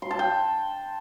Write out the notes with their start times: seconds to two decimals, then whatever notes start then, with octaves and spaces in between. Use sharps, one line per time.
0.02 C6
0.11 A5
0.19 G5